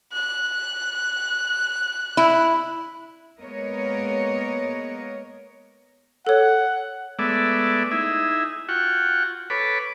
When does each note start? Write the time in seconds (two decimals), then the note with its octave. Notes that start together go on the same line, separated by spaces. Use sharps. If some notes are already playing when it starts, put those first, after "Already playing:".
0.12 F#6
2.17 E4
3.40 G#3 A#3 B3 A#4 C#5 D#5
6.27 A4 C#5 F#5
7.19 G#3 A3 B3 D5 E5
7.91 D#4 E4 G#4 E5
8.69 F4 F#4 F#5 G5 C#6
9.50 A4 B4 C#5 B5 D6